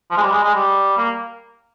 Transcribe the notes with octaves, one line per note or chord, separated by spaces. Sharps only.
F3
G#3
G3
G#3
G#3
G3
A#3